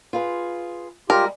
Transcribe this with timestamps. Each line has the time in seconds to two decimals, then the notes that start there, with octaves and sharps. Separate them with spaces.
0.13 F4 G#4 B4
1.10 G3 G#3 F4 G4 A#4